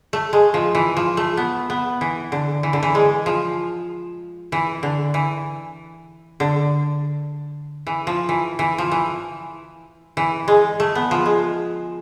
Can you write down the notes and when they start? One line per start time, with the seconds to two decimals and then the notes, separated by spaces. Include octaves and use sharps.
0.13 A3
0.33 G#3
0.54 F3
0.75 E3
0.97 F3
1.17 A3
1.37 B3
1.70 B3
2.01 E3
2.32 D3
2.63 E3
2.73 D3
2.83 E3
2.95 G#3
3.26 F3
4.52 E3
4.83 D3
5.14 E3
6.40 D3
7.87 E3
8.07 F3
8.29 E3
8.59 E3
8.78 F3
8.91 E3
10.17 E3
10.48 G#3
10.80 A3
10.95 B3
11.11 F3
11.26 G#3